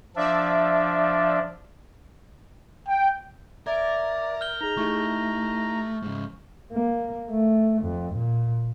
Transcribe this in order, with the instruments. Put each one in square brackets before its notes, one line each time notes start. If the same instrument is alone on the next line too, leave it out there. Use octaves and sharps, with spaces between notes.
[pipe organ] F3 D4 [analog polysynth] D5 E5
[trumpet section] G5
[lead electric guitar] A#4 [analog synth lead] D5 [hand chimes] E5 A#5 G#6
[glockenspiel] F6 G6 G7
[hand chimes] D#4 G#4 [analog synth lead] A#5
[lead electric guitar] A3 [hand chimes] D#4 E4 G4 [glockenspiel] C#6
[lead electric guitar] G#2 C#3
[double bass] A#3
A3
F2
A#2